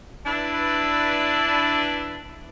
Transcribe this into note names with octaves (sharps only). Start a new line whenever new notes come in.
D4 E4 B4